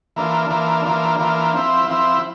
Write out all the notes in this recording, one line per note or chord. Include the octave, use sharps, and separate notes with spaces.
E3 A#3 D4 F4
E3 A#3 D4 F4
E3 A#3 D4 F4
E3 A#3 D4 F4
F3 C4 E4
F3 C4 E4